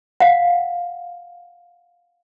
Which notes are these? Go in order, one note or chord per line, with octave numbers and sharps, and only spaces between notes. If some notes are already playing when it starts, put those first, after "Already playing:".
F5 F#5